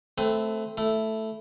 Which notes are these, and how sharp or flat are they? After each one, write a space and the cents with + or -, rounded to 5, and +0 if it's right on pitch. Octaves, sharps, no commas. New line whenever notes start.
A3 +0 C4 +0 B4 +25
A3 +0 E4 +0